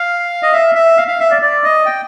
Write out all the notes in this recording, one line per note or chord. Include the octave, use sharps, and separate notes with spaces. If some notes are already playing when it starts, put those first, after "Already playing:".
Already playing: F5
D#5
E5
E5
F5
F5
E5
D5
D5
D#5
G5